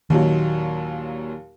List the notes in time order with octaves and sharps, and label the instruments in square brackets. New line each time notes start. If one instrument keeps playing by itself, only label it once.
[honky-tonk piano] D#2 A#2 F#3 [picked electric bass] D#3